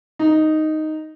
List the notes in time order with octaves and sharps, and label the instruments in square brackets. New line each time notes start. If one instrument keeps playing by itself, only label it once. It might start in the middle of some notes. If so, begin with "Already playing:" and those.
[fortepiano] D#4